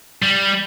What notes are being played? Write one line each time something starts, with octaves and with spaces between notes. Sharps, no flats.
G3